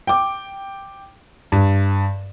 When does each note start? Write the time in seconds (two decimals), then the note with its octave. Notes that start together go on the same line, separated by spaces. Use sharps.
0.07 G5 D6
1.52 G2